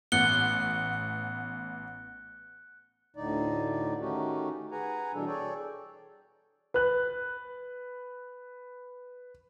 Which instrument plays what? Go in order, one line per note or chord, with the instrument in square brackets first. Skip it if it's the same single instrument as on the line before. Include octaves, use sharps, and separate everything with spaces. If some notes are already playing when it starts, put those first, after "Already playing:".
[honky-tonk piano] A1 B3 [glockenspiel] F#6 C#7 G7
[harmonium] D2 A2 D3 D#4 D5
D#3 A3 C#4 D#4 F#4 G4
G#4 B4 F#5 G#5 A#5
B2 E3 G3 D4 A4
G#4 A4 C#5 D5 G5
[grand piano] B4 F#6